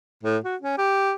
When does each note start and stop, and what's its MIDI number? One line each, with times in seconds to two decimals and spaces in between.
0.23 0.37 45
0.44 0.56 66
0.61 0.77 61
0.77 1.13 67